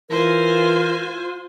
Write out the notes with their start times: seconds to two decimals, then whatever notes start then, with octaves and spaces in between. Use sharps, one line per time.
0.10 E3 F4 A#4 C5 G#5